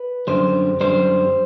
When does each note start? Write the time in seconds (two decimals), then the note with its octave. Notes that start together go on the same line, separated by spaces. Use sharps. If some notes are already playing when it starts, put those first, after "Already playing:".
Already playing: B4
0.27 F#2 D3 G3 C5
0.81 F#2 D3 G3 C5